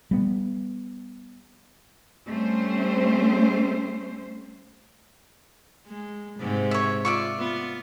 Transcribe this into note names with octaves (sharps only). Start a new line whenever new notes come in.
G3 B3
G3 A3 C4 C#4 C5
G#3
G#2 C3
C#5 E5
F4 D5 E5 C#6
B3 F4